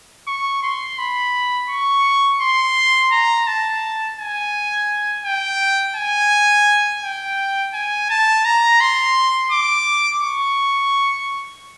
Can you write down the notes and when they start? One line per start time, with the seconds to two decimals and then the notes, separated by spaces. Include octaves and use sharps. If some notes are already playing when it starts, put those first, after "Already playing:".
0.27 C#6
0.63 C6
0.98 B5
1.69 C#6
2.41 C6
3.12 A#5
3.47 A5
4.19 G#5
5.25 G5
5.96 G#5
7.03 G5
7.74 G#5
8.10 A5
8.45 A#5
8.81 C6
9.52 D6
10.23 C#6